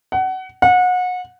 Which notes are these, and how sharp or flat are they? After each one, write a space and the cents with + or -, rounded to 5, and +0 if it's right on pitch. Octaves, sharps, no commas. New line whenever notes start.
F#5 +25
F#5 -30